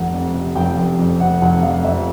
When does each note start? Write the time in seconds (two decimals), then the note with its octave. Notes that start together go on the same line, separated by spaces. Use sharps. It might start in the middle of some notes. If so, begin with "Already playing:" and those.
Already playing: F1 F#5
0.13 F2
0.34 C3
0.55 F1 G5
0.77 F1
0.99 F2
1.20 C3 F#5
1.42 F1 F#5
1.63 F1 F5
1.84 F2 E5